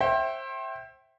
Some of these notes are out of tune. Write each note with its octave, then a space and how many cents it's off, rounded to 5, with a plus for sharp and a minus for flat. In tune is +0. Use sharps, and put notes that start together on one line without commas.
C5 +30 E5 +0 G5 -25